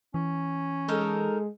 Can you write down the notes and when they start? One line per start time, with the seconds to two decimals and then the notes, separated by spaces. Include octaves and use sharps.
0.14 E3 C#4
0.88 G#3 D#4 A4 A#4